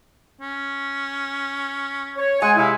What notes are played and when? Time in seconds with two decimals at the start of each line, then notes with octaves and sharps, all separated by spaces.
0.41 C#4
2.17 C#5
2.42 G#3 C#5 F#5 G#5
2.57 C3 E4 F5